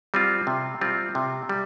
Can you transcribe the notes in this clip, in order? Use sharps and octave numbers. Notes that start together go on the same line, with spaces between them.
G3 C4 F4
C3
G3 C4 F4
C3
G3